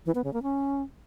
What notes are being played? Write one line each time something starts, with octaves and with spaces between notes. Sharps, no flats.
E3
B3
C#3
A#3
C#4